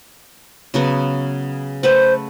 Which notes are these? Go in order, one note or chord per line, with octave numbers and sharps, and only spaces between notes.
C#3 F#3 B3
A3 B4 C5 F#5